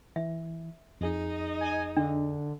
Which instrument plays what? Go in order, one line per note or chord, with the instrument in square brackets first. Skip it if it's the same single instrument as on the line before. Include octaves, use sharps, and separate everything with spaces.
[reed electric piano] E3 [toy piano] E5
[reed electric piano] F2 G#4 [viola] D#4 D#5
[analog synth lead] G#5
[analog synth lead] D3 [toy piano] D4